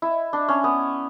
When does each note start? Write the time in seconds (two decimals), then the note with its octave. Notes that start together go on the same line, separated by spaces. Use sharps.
0.02 E4
0.33 D4
0.48 C#4
0.64 B3